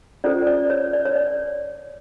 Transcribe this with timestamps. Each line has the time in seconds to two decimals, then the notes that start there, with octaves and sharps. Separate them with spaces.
0.24 C#4 F4 A4 C5 D5
0.47 D5
0.70 C#5
0.93 D5
1.05 C#5
1.16 D5